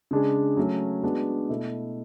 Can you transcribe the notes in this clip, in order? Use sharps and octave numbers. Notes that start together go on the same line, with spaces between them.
C#3 G#3 D4 G#4
F#3 A3 C#4
G#3 B3 D4 F#4
B2 A3 E4 A4